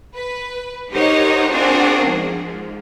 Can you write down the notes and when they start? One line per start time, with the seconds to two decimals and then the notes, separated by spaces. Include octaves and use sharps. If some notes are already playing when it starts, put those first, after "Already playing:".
0.16 B4
0.92 D#4 G4 A#4 C5 C#5 F#5
1.50 C4 D4 F4 F#4 G#4 A#4
2.03 G#2 F3